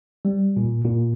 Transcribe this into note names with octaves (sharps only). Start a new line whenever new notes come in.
G3
A#2
A#2